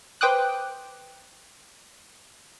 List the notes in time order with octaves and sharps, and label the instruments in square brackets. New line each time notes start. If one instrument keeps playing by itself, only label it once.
[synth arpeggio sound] B4 C5 G5 D6 D#6 F#6